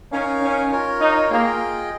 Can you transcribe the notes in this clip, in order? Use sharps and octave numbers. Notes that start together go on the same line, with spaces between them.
C#4 D#4 A#4 C#5 F5 G#5
C#4
F4 A#4 C#5
D#4
A#3 F4 G#4 D#5 G5